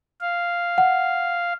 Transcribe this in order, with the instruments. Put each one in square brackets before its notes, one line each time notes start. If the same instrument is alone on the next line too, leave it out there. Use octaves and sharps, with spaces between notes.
[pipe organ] F5
[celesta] F#5